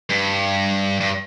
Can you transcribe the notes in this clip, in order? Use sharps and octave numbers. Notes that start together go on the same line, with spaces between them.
G2
G2